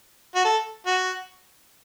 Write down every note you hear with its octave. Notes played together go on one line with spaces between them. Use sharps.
F#4
A4
F#4